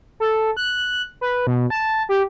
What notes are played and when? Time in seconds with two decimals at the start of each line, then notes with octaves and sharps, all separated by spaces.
0.20 A4
0.57 F#6
1.21 B4
1.47 B2
1.70 A5
2.09 G4